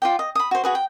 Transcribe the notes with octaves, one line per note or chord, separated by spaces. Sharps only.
F4 D5 G5
D#5
B5 D#6
F#4 C5
F#4 G#4 B4
G5